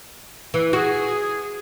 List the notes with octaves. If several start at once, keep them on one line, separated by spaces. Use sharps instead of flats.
E3
F#4 G#4